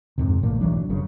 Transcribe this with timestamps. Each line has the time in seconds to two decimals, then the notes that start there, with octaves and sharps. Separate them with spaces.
0.18 F2 G#2 C3
0.43 A1 A#2 A3 A#3
0.61 B1 E3 F#3 D4
0.89 F#1 F#2 C#3